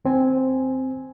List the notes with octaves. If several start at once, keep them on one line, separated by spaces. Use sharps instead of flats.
D#2 C4 G#5